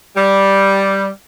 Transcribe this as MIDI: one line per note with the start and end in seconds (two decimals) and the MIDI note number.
0.16 1.07 55